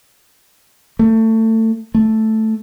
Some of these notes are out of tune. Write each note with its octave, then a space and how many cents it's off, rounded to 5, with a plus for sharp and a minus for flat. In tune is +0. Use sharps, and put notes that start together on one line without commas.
A3 +25
A3 +0